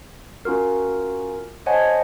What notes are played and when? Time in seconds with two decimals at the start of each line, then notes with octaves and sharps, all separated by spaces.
0.45 C#4 F4 F#4 A#4
1.66 C5 C#5 D#5 F#5 G#5 A5